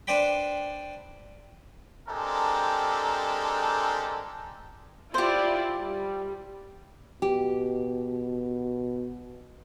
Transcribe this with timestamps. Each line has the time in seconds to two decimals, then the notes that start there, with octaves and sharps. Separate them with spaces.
0.07 D4 B4 C5 D5 G5 B5
2.09 G#3 C4 D4 G4 A4 A#4
5.14 E4 F4 G4 C5 D5
5.78 G3
7.22 B2 G4